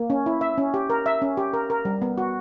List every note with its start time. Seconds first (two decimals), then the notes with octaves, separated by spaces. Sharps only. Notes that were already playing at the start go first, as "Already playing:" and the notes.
Already playing: A#3
0.10 C#4
0.26 E4
0.41 E5
0.58 C#4
0.74 G4
0.90 A#4
1.06 E5
1.22 C#4
1.37 G4
1.53 A#4
1.70 A#4
1.85 G3
2.02 B3
2.18 F#4